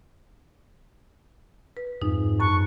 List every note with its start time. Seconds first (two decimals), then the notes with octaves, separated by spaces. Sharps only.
1.77 B4
2.02 F2 G#2 D#4
2.40 F#2 A5 C#6 F#6